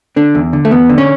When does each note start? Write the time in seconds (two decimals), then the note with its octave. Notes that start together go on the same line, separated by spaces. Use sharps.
0.16 D3 D4
0.35 E2
0.53 D3
0.65 A3
0.71 E2 B3
0.89 D3
0.98 C#4